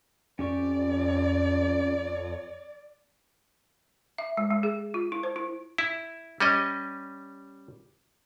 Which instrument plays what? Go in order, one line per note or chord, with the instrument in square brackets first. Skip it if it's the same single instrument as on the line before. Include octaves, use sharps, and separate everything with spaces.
[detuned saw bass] F2 [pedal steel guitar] C#4 G4 C#6 [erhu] D5
[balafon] E5
G#3
G#3
G#4
F4
E4
C5
E4
[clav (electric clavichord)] E4
G3 C#4 D#5